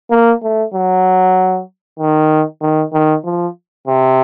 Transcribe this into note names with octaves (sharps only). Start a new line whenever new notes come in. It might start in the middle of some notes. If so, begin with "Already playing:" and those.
A#3
A3
F#3
D#3
D#3
D#3
F3
C3